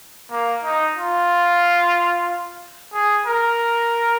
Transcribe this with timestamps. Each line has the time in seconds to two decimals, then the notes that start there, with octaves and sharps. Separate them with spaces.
0.31 A#3
0.64 D#4
0.96 F4
2.93 G#4
3.26 A#4